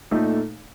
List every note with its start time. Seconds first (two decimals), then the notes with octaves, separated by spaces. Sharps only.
0.11 A#2 A3 D#4 A4